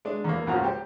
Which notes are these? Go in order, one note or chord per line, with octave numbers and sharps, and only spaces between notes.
G#3 D4
E2 A#3
C#2 G#2 C#3 F3 F#4 A#5
G4 C5